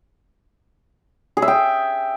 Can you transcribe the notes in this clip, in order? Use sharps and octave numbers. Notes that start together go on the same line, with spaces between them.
G#4
E5
G5